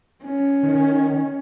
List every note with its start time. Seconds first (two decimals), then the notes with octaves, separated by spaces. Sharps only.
0.24 C#4
0.63 D#3